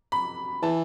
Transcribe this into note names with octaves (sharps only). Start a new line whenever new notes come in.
B5
E3 A5